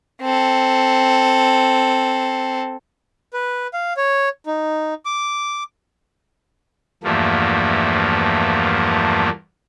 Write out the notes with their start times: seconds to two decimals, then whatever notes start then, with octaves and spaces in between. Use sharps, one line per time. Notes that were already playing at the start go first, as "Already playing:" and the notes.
0.21 C4 A4
3.33 B4
3.74 F5
3.97 C#5
4.46 D#4
5.05 D6
7.03 E2 G2 F3 A3 A#3